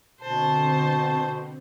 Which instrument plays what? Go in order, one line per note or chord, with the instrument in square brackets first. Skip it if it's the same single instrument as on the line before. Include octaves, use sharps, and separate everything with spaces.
[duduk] B2 [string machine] D3 C4 [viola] C5 [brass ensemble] A5